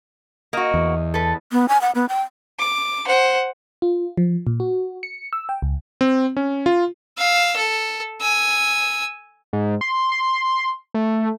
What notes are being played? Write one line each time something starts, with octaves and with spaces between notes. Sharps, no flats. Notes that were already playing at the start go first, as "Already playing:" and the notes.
A#3 F#4 D#5
E2
A4 B4
B3
G#5
F#5
B3
G5
D6
C5 F#5
F4
F3
A#2
F#4
C#7
E6
G5
C#2
C4
C#4
F4
F5 E6
A4
G#5 E6
G#2
C6
C6
A3